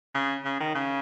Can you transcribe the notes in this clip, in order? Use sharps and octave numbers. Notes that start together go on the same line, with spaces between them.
C#3
C#3
D#3
C#3